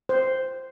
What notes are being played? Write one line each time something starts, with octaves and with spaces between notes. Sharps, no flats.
C5